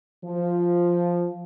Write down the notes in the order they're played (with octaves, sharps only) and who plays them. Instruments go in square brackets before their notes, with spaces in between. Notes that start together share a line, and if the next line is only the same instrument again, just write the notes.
[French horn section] F3